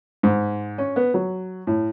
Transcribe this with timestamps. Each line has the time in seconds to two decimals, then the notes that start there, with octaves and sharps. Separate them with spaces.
0.23 G#2
0.78 C#4
0.96 B3
1.14 F#3
1.67 A2